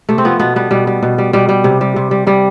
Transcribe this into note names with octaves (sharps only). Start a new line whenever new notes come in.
C3 A3
C4
F3 B3
B2 B3
G3 B3
B2 G3
G3
B2
G3
B2 G3
G3
C3
G3
C3
G3
C3 G3